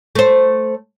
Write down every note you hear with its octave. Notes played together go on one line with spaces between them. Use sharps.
A3 C5